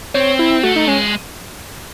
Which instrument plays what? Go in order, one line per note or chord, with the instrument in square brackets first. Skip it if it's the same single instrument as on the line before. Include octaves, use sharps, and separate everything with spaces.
[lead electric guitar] C4 [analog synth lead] C#5
[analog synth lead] E4
[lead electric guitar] A3 [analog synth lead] F#4
[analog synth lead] D#4
[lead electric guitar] G#3 [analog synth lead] C#4